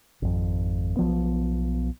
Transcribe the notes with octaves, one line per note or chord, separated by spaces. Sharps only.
G#1 F2
B1 F3 B3